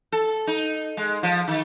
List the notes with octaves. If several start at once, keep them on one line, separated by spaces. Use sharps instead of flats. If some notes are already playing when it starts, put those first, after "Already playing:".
A4
D#4
G#3
F3
D#3